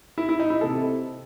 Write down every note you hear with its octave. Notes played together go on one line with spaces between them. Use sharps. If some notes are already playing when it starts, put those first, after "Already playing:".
E4
E4
D#4
E4
C3 A4